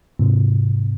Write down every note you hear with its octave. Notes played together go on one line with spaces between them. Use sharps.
G#2 C3